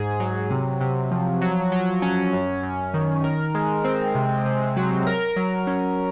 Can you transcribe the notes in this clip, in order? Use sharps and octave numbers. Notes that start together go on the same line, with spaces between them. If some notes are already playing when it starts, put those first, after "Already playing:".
Already playing: G#2 G#4
F#3
C3
C3
F3
F#3
F#3
C#4
F#2
F#2
D#3
A#4
G#3
C4
C3
C3
F#3
A#4
F#3
C#4